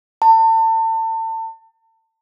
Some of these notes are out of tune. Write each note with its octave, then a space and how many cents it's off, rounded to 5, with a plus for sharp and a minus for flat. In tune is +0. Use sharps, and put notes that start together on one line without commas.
A5 +35